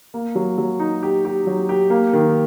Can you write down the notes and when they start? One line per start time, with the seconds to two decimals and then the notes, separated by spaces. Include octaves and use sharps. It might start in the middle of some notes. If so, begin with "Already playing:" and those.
0.14 A#3
0.35 F#3
0.58 F#3
0.79 D#4
1.03 G4
1.25 G4
1.47 F#3
1.69 G4
1.90 A#3
2.13 D#3